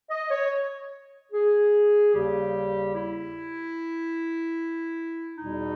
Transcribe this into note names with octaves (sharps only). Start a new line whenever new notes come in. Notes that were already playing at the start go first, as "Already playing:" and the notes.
D#5
C#5
G#4
D#2 C#3 G3 G4
E4
E2 B2 G3 D#4